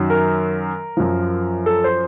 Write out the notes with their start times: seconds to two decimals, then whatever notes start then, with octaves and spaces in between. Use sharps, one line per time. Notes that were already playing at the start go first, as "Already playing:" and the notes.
Already playing: F#2 D#3 F#3
0.10 A#4
0.97 F#2 F3
1.66 A4
1.84 C5